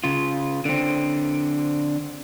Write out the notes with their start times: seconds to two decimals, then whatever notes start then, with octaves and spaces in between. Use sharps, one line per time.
0.04 C#3 F4
0.65 D3 C4